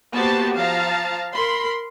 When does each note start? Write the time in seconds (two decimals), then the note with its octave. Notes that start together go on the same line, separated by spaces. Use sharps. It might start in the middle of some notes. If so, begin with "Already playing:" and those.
0.14 A#3 B3 F#4 G4 C5 A5
0.55 F3 F5 A5 A#5
1.34 A#4 B5 C6